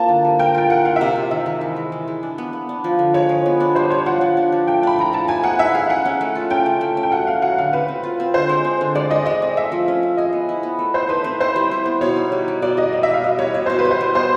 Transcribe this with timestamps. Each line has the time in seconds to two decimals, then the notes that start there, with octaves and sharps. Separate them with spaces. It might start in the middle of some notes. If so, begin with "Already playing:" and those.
Already playing: A#3 C4 F4 A5
0.09 D3
0.25 G3
0.39 A#4 G5
0.54 F4 G5
0.70 A#4 F#5
0.85 F4 F5
0.96 E5
1.01 C3
1.07 F5
1.16 C3
1.31 D#3 E5
1.46 G#3
1.61 E3
1.76 G#3
1.92 E3
2.08 G#3
2.23 D4
2.38 B3
2.53 B3
2.69 D4
2.84 F3
2.99 D3
3.14 G#3 C#5
3.29 F3
3.46 B3
3.60 D4
3.75 G3 C5
3.90 G3 C#5
4.06 F3 F#5
4.21 F3
4.37 D4
4.52 F3
4.67 A3 G5
4.83 D4 B5
4.99 F3 A#5
5.13 A3 A5
5.28 D#4 G#5
5.43 B3 F#5
5.59 D#4 E5
5.74 G#4 F5
5.89 C#4 F#5
6.05 C#4
6.21 A3
6.35 F4
6.50 C#4 G5
6.66 C#3
6.81 A3
6.97 C#4
7.03 G5
7.12 F#3 F#5
7.27 C#4 F5
7.42 F#3 F#5
7.58 D3 F5
7.73 C4 B4
7.88 C4
8.03 F4
8.20 C4
8.34 D3 C5
8.49 G#3
8.64 C4
8.81 D3
8.95 G#3 D5
9.11 G#3 D#5
9.26 G#3 D#5
9.42 C4
9.57 A3 E5
9.72 F3
9.88 C#4
10.03 C#4
10.17 G#4 D#5
10.33 B3
10.49 E4
10.63 B3
10.79 A3
10.94 A3 C5
11.09 D#4 B4
11.24 C4
11.40 E4 C5
11.56 G3
11.71 E4
11.86 B3
12.01 B2 C#5
12.16 D#4
12.32 G3
12.48 G3
12.62 B2 D5
12.77 G3 D#5
12.93 B3 D#5
13.03 B3 E5
13.14 F5
13.24 B2 D#5
13.38 G3 C#5
13.54 B2 C#5
13.66 B2 C5
13.79 B4
13.85 G3
13.91 C5
14.01 G3
14.15 B3 C5